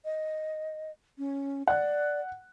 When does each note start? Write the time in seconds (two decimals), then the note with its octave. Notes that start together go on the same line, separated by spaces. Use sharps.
0.05 D#5
1.18 C#4
1.68 D5 F#5 F#6